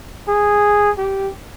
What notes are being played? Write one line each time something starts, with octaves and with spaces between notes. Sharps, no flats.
G#4
G4